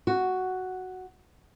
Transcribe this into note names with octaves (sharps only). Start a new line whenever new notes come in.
F#4